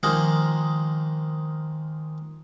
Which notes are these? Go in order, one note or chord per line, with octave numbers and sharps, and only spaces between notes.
D#3 F3 G#3 A#3 D#4